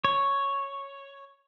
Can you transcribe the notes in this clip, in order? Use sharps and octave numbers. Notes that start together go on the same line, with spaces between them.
C#5